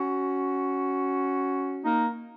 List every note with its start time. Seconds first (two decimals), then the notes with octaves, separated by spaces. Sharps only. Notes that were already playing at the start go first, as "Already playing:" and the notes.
Already playing: C#4 F#4
1.84 A#3 D#4